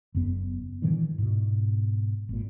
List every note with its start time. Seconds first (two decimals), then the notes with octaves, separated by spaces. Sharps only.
0.15 F#1 F#2 B3
0.82 G2 A#2 D#3 E3
1.18 G#2 B2
2.29 G#1 A#2